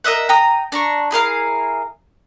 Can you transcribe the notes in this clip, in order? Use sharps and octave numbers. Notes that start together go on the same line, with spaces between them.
A#4 D#5 E5 F#5
G5 A#5 D#6
D4 A#5 C#6
E4 G#4 A#4 F5